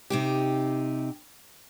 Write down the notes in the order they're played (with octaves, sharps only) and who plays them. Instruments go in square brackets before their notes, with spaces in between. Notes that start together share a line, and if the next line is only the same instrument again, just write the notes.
[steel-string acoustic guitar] C3 D#4 G4